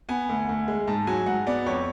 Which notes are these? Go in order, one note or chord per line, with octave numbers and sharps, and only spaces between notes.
B3 G#5
D2
D2
G#3
G#2 A5
F#3 G#5
G#2 F#5
B3 D5
F2 C#5